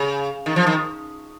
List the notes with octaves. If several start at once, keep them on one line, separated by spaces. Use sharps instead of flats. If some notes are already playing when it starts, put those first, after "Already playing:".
Already playing: C#3
D#3
F3
D#3